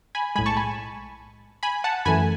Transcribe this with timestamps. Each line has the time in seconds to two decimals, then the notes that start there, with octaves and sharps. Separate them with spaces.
0.15 G#5 B5
0.35 B1 A2 G#3 G#5 B5
0.46 A5 C#6
0.57 G#5 B5
1.63 G#5 B5
1.84 F#5 A5
2.05 F#2 E3 A3 G#5 B5